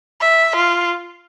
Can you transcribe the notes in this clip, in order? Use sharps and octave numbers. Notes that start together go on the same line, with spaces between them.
E5
F4